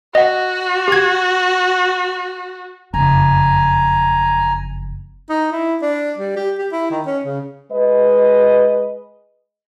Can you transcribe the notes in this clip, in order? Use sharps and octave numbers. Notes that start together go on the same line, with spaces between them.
F#4 D#5 F#5
G4 G#6
F#1 F2 G#5 A#5
D#4
E4
D4
G3
G4
G4
E4
D#3
C#4
C#3
G#3 B4 D#5